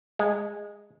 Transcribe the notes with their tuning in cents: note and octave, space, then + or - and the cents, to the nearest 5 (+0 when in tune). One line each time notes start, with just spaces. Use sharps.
G#3 -15